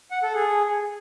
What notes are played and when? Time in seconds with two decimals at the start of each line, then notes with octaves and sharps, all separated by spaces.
0.11 F#5
0.23 A4
0.35 G#4